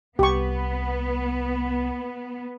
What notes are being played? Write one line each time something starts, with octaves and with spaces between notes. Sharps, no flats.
C2 B3 G4 C#6